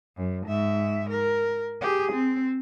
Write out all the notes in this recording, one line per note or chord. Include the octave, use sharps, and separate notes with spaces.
F#2
G#2 E5
A#4
G4 G#4
C4